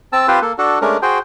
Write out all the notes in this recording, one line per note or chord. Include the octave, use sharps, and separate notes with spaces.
C4 A5 E6
C4 F4 G4 B4 C5
A#3 A4
D4 F#4 A4
G#3 A3 C#4 D4 A#4
F#4 G#4 C5 G5